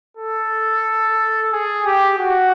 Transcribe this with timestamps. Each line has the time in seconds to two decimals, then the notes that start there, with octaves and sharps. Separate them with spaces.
0.16 A4
1.51 G#4
1.85 G4
2.17 F#4